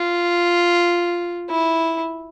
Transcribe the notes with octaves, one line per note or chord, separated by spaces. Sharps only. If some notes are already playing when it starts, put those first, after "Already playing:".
Already playing: F4
E4